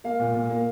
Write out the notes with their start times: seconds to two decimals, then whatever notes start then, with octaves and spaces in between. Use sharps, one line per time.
0.04 A#3 F5
0.19 A#2
0.34 A#2
0.50 A#3